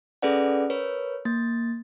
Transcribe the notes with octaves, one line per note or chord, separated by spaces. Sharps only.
C#4 G#4 A4 B4 D5 F#5
A#4 B4 C#5
A#3 A6